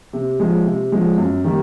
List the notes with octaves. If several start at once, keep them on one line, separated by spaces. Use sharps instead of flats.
C3
F3 G#3
C3
F3 G#3
F#2
D#3 G3 A#3